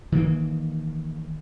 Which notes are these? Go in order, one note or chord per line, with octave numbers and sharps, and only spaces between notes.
D#3 E3 A#3